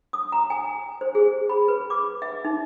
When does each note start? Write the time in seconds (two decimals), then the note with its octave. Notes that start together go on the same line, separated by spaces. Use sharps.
0.13 D#6
0.32 A#5
0.50 G#5
1.01 C5
1.15 G#4
1.49 B5
1.68 B4
1.90 D6
2.22 E5
2.45 D#4